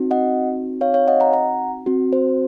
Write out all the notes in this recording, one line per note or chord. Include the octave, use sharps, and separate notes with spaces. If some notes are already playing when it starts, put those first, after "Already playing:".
Already playing: C4 D#4 F#4
D#5 F#5
C#5 F5
C#5 F5
D#5 F#5
F#5 A#5
F#5 A#5
C4 F#4
C5